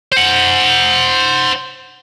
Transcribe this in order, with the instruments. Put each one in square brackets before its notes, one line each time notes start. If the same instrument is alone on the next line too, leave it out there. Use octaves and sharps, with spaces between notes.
[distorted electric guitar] C5 F#5